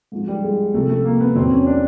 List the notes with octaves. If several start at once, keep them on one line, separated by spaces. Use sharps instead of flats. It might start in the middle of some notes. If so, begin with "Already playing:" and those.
G#2 F3
G3
G#3
C2 C3 F3 A3
A3
A#3
B3
E2 B2 F#3 C4
C#4
D4